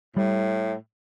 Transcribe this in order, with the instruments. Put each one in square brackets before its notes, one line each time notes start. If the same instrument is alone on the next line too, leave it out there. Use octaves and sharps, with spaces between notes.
[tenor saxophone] A2 [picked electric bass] G3